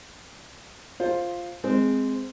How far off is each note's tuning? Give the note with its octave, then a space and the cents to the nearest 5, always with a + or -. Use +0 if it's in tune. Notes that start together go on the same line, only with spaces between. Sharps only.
F4 +0 C5 +10
G#3 +0 C4 -10